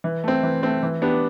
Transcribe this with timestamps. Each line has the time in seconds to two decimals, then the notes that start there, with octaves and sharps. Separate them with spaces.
0.04 E3
0.24 A3 C4
0.43 E3
0.63 A3 C4
0.83 E3
1.02 B3 D4 G4